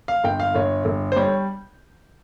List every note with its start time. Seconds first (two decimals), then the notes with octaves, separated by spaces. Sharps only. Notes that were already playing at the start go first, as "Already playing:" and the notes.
0.08 F5
0.24 G1 G5
0.40 F5
0.55 G1 C#5
0.85 G1
1.12 C5
1.16 G3 C#5